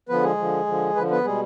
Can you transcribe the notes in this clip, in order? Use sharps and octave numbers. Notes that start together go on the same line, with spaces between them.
D3 F3 B3 B4
G#3 G#4
D3 F3
D3 F3
D3 F3 B4
B3 B4
B2 G3 G#3 G#4